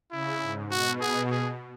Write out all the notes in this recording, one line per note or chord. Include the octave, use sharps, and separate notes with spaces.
C#3 E4
G#2
B2 F#4
G#4
G#4